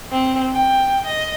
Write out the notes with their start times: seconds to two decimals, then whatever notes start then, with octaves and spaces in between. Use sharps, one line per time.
0.10 C4
0.52 G5
1.05 D#5